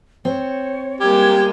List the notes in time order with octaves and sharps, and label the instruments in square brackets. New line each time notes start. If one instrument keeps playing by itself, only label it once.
[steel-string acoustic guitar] C4 [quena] C#5
[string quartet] G3 G#3 A#3 [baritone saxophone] G4 [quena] G#6